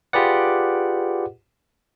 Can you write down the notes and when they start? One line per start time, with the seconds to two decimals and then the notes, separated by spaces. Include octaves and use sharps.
0.13 F4 G4 G#4 B4 D5 F#5